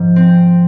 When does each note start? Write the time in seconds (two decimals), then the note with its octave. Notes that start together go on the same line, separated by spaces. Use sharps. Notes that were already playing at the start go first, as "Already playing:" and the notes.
Already playing: G#2 F3
0.16 C4